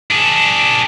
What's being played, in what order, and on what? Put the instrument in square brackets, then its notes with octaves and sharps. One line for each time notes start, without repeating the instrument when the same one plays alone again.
[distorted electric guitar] D4 G#4